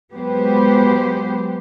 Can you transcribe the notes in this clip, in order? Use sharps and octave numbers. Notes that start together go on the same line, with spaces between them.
F#3 G#3 B3 G4 B4 C5